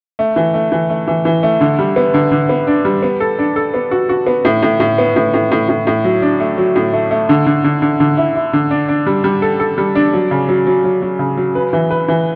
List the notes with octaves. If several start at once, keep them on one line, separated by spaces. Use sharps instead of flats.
A3
E3
A3
E3
A3
E3
E3
A3
D3
G3
B3
D3
D3
B3
D4
G3
B3
A4
D4
A4
B3
F#4
F#4
B3
A2
A2
A2
B3
A2
A2
A2
A2
A2
F#3
D4
A3
F#3
A2
A3
A3
D3
D3
D3
D3
D3
E4
E4
D3
D4
D4
G3
G3
A4
A4
G3
D4
F#3
C#3
F#3
F#3
F#3
F#3
C#3
F#3
B4
E3
B4
E3